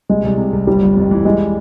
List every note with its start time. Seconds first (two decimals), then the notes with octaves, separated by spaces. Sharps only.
0.09 C2 G#3
0.24 C2
0.38 C3
0.53 C2
0.67 G1 G3
0.82 G1
0.96 F2
1.11 E3
1.25 G3 G#3